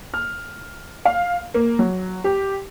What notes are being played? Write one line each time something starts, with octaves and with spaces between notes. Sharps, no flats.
F6
F5
A#3
F#3
G4